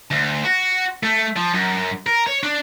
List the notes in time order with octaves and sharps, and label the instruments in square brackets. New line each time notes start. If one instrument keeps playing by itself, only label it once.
[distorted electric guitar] D2
F#4
A3
F3
F#2
A#4
C#5
D4